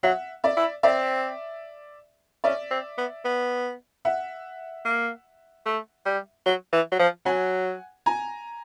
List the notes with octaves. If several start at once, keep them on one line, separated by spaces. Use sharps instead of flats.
F#3 E5 F#5
D5 E5
E4
C4 D5 E5
C#4 D5 E5
C4
B3
B3
E5 F#5
A#3
A3
G3
F#3
E3
F#3
F3
F#3 F#5 G#5
G#5 A#5